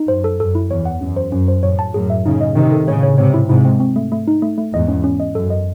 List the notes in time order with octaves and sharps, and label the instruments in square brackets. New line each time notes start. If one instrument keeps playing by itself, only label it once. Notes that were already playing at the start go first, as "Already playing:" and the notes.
Already playing: [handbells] D#4
[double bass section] F#2 [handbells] C5
[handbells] A4
[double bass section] F#2 [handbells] A4
[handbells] E4
[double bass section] E2 [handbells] C#5
[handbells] F#5
[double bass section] F#2 [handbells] C#4
[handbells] C5
[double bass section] F#2 [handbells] C#4
[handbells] C5
[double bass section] F#2 A2 [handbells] C#5
[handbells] A5
[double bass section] F#2 A2 [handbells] G#4
[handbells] E5
[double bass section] A2 C#3 [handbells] D#4
[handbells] D#5
[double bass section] C3 D#3 [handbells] D#4
[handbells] A4
[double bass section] A2 C#3 [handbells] C#5
[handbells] C#5
[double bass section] G#2 C3 [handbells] C#5
[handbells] E4
[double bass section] G#2 C3 [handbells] E4
[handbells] C4
C4
A3
A3
D#4
A3
A3
[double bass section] E2 G#2 [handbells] D#5
[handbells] C#4
C#4
D#5
[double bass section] F#2 [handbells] A4
[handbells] D#5